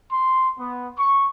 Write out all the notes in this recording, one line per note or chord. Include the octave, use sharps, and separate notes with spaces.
C6
B3
C#6